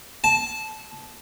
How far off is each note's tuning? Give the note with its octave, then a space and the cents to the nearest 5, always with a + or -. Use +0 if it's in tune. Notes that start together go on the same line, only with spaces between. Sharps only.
A5 -15